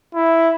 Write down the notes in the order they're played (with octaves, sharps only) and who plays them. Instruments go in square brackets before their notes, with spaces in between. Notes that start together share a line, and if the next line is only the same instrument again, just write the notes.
[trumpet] E4